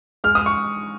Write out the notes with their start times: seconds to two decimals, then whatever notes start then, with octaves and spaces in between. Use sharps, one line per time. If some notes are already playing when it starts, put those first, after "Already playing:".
0.24 G#3 F6
0.35 D#6
0.46 C#6